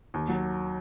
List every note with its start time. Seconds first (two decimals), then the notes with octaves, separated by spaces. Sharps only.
0.14 D#2
0.29 F#3